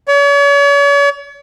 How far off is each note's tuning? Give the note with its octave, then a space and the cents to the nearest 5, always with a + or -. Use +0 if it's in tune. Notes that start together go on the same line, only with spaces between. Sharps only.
C#5 +40